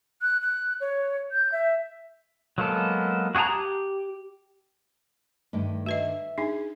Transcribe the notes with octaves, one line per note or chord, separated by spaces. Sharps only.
F#6
F#6
C#5
G6
E5
F#3 G#3 A#3 B3 A4
F#4 G#4 F#5 A5 A#5
G4
G2 D3 D#3 A3
F#4 B4 D#5 E5
D4 D#4 G#4